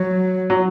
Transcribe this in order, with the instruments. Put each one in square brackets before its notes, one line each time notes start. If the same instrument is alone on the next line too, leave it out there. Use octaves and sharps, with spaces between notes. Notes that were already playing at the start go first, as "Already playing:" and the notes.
Already playing: [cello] F#3
[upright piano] F#3